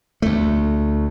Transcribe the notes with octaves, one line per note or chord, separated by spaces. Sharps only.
D2 A3